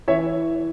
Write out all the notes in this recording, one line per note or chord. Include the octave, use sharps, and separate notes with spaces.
E3 C#5 E5